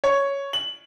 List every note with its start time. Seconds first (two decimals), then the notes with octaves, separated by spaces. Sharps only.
0.04 C#5
0.53 F#7